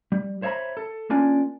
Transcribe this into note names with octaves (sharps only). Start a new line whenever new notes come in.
G3
C5 C#5 E5 F5 A#5 B5
A4
A#3 C#4 D4 F4 D5 G#5